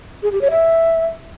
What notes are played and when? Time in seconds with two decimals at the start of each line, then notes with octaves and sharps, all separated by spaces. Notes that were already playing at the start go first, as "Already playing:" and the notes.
0.23 G#4
0.32 G4
0.41 C#5
0.51 E5